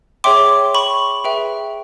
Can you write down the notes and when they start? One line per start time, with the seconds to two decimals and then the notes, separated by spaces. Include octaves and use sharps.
0.24 G#4 C#5 E5 G5 C6 D6
0.75 B5 C#6
1.24 G#4 B4 E5 G5